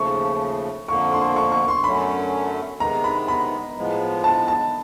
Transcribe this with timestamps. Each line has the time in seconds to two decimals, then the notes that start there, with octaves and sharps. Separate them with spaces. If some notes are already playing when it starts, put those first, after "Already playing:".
Already playing: D#2 C#3 F3 A3 C#6
0.88 F2 D3 F3 A#3 C#6
1.13 C6
1.36 C#6
1.52 C#6
1.68 C6
1.84 F#2 D3 F#3 A3 C#4 B5
2.80 C3 D#3 G#3 B3 A#5
3.04 B5
3.28 B5
3.76 A2 F3 G#3 B3
4.24 A5
4.48 A5